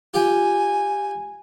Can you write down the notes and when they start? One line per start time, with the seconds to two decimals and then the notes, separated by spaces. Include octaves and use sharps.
0.14 F4 G4 G5 G#5